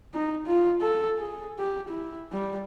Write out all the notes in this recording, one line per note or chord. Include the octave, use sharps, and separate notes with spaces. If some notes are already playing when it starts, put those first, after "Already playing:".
D#4
F4
A4
G#4
G4
E4
G3